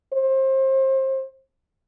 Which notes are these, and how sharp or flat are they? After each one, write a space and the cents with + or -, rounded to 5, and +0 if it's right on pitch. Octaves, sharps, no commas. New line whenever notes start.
C5 +30